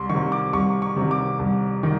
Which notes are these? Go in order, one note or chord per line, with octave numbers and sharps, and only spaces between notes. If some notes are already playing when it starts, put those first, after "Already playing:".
Already playing: C2 C6
C3 D#3 C#6
D6
C2 C#6
C#6
C3
D#3
D6
C2
D#3